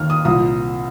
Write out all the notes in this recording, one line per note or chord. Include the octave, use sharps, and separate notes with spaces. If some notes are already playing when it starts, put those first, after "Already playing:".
Already playing: D#2 D#3 F6
D#6
C2 A#2 F3 D#6